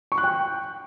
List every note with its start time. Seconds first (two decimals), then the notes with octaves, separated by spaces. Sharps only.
0.12 C#6
0.18 F#6
0.24 G5